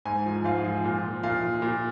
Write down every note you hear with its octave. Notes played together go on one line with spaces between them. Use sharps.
G#2 G#5
F3
G#2 F5
F3
A#2
F3
A#2 F5
F3
A#2